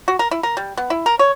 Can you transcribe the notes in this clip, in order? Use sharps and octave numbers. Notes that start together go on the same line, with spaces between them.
F#4
A#4
E4
A#4
G3
B3
E4
A#4
C#5